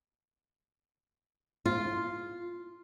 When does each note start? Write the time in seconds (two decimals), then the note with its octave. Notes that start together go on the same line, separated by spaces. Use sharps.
1.66 F4